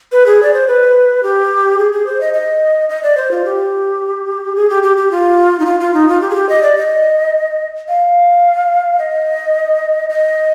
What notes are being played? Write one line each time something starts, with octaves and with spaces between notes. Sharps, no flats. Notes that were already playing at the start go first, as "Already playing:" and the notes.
B4
G#4
D5
C5
B4
G4
G#4
G#4
C5
D#5
D#5
D#5
D5
C5
F4
G4
G#4
G4
G4
G4
F4
D#4
F4
F4
D#4
F4
G4
G#4
G4
D#5
D5
D#5
F5
D#5
D#5